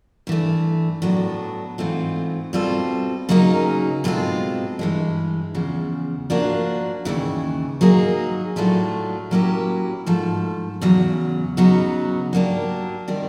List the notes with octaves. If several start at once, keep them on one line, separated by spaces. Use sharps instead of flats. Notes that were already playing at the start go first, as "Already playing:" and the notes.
G2 E3 A3
A2 F#3 B3 D4
G#2 E3 A3 C4 F4
B2 G3 C4 F4 A4
C#3 F#3 A#3 D#4 G#4
B2 G#3 C4 F4 A4
G2 E3 G#3
E2 C#3 F3
F3 A#3 D4 F#4
D#2 C#3 E3
F#3 A#3 D#4 G#4
A2 F#3 A3 D4 F4
F#3 A#3 C#4 E4 G4
G#2 F3 A3
E2 C#3 F#3
C#3 F#3 B3 D#4
F#3 A#3 D4 G4
D#3 G3 C4